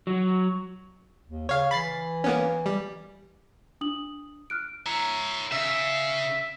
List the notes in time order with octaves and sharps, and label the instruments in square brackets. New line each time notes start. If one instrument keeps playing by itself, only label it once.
[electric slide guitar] F#3
[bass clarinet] D#2
[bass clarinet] C#3 [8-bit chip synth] C#5 F5
[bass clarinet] E3 [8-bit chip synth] B5 A6 C7
[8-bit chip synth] A#3 B3 C#4
G3
[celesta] D4 D#6 F#7
F6 F#6 D7
[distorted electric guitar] C#5 E5 [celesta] A#5
[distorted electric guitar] C#3 [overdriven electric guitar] E5